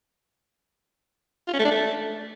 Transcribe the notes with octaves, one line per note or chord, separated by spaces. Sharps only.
F4
C#4
A3
D4
A3